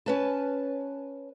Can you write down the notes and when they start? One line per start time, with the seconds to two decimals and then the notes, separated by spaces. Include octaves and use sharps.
0.06 C#4 B4 A5